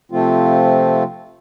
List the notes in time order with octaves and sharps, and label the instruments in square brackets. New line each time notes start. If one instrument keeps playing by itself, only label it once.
[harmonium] C3 F3 A3 C4 F4